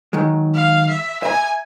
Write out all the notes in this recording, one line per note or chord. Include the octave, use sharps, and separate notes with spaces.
D#3 F#3 G#3
F5
E5
E5 G#5 A#5